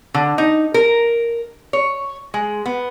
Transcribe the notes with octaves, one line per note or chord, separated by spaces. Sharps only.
D3
D#4
A#4
C#5
G#3
B3